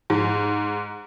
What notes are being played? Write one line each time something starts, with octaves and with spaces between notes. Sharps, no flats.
G#2